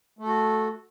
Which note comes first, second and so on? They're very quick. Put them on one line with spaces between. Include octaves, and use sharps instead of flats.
A3 A4 F#4